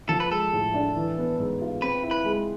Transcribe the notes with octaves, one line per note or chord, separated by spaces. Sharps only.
F3 A4
B4
G#3 A4
A2
D4
E3
B3
G#2
F4
C4 B4
E4
B4
G#3